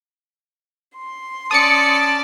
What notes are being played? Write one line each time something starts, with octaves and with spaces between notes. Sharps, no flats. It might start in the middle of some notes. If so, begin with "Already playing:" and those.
C6
C#4 D5 A5 D#6 C#7